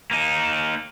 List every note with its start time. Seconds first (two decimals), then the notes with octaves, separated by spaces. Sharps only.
0.11 A#3 D#4